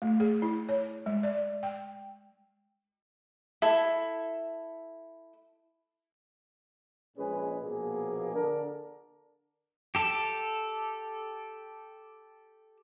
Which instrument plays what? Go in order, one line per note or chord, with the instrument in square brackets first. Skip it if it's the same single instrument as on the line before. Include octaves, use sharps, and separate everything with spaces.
[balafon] A3
G#4
E4
C#5
G#3
D5
G5
[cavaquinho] E4 A4
[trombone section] A#1 A#2 G#3 C#4 G#4 B4
A#1 B2 F3 A#3 G#4
D3 D4 A4 A#4
[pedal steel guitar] G4 A4